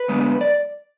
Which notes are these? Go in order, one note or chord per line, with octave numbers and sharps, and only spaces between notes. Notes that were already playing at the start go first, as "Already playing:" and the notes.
Already playing: B4
F#2 D3 G#3 B3
D5